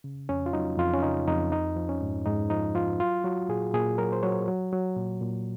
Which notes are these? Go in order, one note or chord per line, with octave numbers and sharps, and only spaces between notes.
C#3
F2 C#4
F4
F#3 D#4
F2 F4
C#4
C#3 D#4
F2 D#4
F3 D#4
F3
C#4
G#2
G#2 D#4
F3 D#4
F3 F4
F#3 F4
F#3 F#4
A#2 G#4
A#2 G#4
F#3 A#4
C5
F#3 C#5
F#3
F#3
A#2
A#2